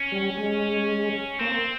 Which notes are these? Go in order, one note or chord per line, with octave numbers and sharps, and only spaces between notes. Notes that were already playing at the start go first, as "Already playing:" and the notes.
Already playing: C#4
G3
G#3
A#3 C4